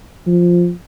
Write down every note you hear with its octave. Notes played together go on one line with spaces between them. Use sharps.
F3